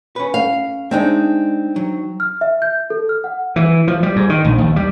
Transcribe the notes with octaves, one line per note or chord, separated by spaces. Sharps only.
C#4 B4
F5
G#3 C4 D4 D#4 E5
F#3
F6
E5
G6
A4
F6
F#5
E3
F3
G3
G#2
D#3
A#1
D#2
G3